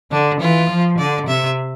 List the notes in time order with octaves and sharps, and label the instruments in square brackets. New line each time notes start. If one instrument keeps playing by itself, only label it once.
[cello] D3 [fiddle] D4
[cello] E3 [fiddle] F4
[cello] F3
[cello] D3 [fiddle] D5
[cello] C3 [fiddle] E5